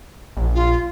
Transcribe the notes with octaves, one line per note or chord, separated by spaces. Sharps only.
A#1
F4